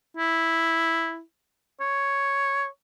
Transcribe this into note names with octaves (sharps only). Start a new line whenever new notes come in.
E4
C#5